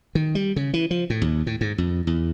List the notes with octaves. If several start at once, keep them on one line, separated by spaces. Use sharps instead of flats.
D#3
G3
C#3
E3
F3
A2
D#2
A2
G#2
F2
E2